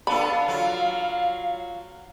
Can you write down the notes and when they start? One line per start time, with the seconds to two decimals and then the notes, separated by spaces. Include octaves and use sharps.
0.07 B3 D4 A4 F5 B5
0.48 F#3 F4